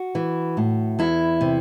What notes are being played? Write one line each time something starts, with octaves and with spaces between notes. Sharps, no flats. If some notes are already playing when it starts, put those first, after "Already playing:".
Already playing: F#4
E3
A2
E2 E4
C3